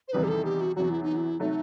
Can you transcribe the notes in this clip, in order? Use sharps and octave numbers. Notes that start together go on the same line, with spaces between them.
C5
E2 C3 D#3 G3 D#4 B4
G4
A4
G4
F#4
E2 C3 F#3 F#4
E4
D#4
E4
C3 F#3 A3 D#4